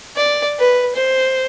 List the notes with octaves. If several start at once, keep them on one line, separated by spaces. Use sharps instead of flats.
D5
B4
C5